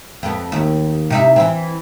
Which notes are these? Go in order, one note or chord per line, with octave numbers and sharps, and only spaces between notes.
F2 B3
D#2
C3 D#4 E4
E3 C4